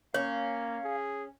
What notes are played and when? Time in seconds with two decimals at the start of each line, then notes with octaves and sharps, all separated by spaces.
0.14 A#3 C#4 C#5 F5
0.84 G#4